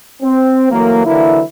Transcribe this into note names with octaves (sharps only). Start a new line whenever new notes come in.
C4
E3 F#3 A3 A#3
D3 E3 F#3 A#3 E4